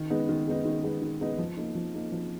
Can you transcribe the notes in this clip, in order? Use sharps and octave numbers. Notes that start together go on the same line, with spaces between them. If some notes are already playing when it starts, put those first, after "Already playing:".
Already playing: D#3
G#3 B3 D#4
D#3
G#3 B3 D#4
D#3
G#3 B3 D#4
D#3
G#3 B3 D#4
F3
A#3 D#4
F3
A#3 D#4
F3